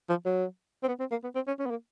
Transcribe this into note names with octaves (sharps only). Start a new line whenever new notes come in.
F3
F#3
C4
B3
C4
A#3
B3
C4
C#4
C#4
B3
A#3